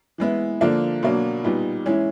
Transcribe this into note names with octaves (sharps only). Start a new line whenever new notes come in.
E3 G#3 B3 E4
D3 F3 A#3 D4
B2 F#3 A#3 D4
A#2 G3 B3 D#4
E3 G#3 C#4 E4